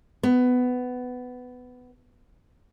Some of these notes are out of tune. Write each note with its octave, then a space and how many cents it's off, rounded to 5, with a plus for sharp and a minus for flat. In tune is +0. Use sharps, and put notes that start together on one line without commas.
B3 +15